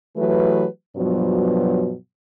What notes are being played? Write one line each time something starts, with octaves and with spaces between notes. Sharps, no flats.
E3 F#3 A3 G4 B4
G2 B2 F3 F#3